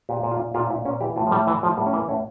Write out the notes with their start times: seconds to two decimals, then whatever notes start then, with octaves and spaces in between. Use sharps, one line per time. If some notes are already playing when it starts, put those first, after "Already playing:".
0.09 A#2 G4
0.23 A#2
0.31 F4
0.40 A#2
0.54 A#2 F4
0.70 A#2 E4
0.85 A#2 C#4
1.01 E3 G4
1.16 A2 F4
1.27 F3
1.31 A2 G3
1.47 E3
1.62 A2 F3
1.77 A2 G3
1.86 C#4
1.93 E3 A#3
2.09 A2 C#4